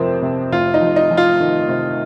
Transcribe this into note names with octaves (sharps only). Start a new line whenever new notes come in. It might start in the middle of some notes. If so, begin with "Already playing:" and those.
Already playing: F2 C3 F3 A#3 C4
C3
F1 F4
D#4
F2
D#4
F2
F4
D#3
C3